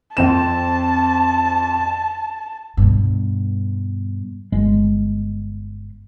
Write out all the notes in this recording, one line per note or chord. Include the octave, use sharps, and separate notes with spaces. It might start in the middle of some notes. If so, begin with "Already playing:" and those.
F2 C4 A5 E7
G2 B2
G1 G#3